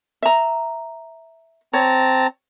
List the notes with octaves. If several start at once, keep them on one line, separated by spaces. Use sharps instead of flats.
E5 A#5
C4 C#5 A5 A#5